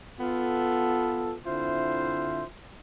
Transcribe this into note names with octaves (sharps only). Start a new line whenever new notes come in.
B3 F4 A4
D3 C4 E4 F4 C5 E5